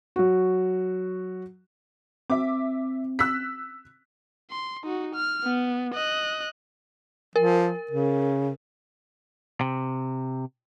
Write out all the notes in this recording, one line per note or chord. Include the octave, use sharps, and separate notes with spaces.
F#3 F#4
C4 E5 D6
E6 F#6 B6
C6
D#4 F#4
F6
B3
D#5 F#6
F3 A#4
C#3
C3